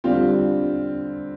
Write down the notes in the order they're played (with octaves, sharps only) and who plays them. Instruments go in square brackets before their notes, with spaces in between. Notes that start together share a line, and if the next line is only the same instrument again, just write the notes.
[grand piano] D3 G3 C4 F4